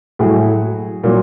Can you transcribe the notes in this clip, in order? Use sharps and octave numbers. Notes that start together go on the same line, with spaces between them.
A2 F#3 F#4 G#4
A#2 F#3